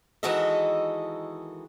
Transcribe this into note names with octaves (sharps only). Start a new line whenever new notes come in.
D#3 E3 G#3 F#4 A4 D#5